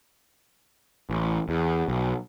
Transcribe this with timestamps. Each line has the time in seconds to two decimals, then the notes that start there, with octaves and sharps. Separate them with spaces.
1.10 A1
1.49 E2
1.88 B1